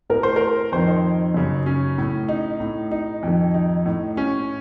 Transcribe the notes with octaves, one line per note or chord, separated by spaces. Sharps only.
A2 A#4
C5
A#4
F2 D#3 C5
D#4
F#2 C#3
C#4
A2
D#4
A2
D#4
F2 D#3
D#4
A2
C#4